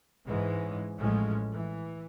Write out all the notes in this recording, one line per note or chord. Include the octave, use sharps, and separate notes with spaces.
G#2 E3 G#3 C#4
A1 A2 F3 G#3 C#4
E3